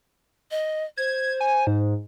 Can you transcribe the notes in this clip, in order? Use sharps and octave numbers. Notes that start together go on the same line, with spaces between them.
D#5
C5 G#6
G#5
G#2